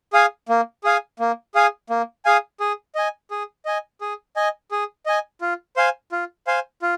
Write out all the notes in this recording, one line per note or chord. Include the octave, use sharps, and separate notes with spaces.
G#4 F5 G#5
A#3
G#4 F5 G#5
A#3
G#4 F5 G#5
A#3
G#4 F5 G#5
G#4
D#5 G#5
G#4
D#5 G#5
G#4
D#5 G#5
G#4
D#5 G#5
F4
C5 F5 G#5
F4
C5 F5 G#5
F4